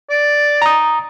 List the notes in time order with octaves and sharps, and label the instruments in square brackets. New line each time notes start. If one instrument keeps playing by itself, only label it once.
[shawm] D5
[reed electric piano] A#5 D#6